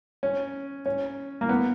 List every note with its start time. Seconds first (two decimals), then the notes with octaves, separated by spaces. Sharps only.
0.23 C#4
0.86 C#4
1.41 A#3
1.49 B3